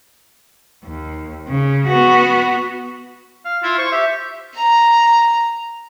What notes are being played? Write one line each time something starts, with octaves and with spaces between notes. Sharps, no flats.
D#2
C#3
B3 F#4
F5
E4 F4
C5 C#6
G4 E5
A#5